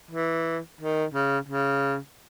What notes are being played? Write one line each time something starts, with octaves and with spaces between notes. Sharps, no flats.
E3
D#3
C#3
C#3